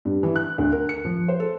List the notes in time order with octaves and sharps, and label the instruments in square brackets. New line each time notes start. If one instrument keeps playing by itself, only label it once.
[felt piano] G2
E3
F#6
D2
A#4
C#7
F3
C5
A4